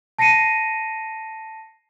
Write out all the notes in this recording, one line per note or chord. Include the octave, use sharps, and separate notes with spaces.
A5 A#6 C7 C#7 D#7